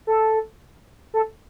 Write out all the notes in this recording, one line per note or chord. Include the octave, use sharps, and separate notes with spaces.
A4
A4